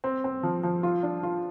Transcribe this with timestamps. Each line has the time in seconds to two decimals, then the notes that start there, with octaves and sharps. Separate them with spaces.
0.04 C4
0.24 C4
0.43 F3
0.63 F3
0.83 F4
1.03 D4
1.23 F4